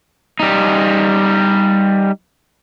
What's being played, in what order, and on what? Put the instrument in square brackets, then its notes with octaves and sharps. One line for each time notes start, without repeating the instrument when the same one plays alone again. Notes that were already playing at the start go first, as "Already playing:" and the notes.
[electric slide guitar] G3 D#4